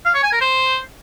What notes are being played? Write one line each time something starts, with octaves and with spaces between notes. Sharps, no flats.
F5
C#5
G#5
A#4
C5